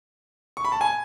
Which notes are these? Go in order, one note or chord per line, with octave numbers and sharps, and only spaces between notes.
C#6
B5
A5
G#5